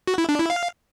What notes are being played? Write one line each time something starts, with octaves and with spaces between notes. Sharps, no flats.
F#4
E4
D4
E4
F5